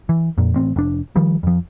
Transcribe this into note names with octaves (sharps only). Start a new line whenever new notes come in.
E3
F2 A#2
A1 C4
F1 D4
D#3 F3 G3
F2 F3